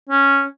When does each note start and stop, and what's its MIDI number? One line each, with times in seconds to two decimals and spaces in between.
0.09 0.44 61